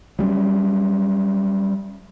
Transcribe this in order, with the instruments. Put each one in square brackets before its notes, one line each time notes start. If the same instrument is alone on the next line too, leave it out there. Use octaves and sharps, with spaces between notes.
[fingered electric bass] F#3 G3 B3 C#4